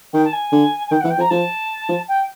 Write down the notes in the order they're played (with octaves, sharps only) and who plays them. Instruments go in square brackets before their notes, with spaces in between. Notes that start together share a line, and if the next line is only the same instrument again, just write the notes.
[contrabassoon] D#3 [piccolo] G5
[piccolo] A5
G#5
[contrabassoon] D3
[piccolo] G#5
[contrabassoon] D#3 [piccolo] G5
[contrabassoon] E3 [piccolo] F#5
[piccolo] G5
[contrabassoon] F3
[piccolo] A#5
[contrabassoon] F3 [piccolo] A5
[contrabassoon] F3
[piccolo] G5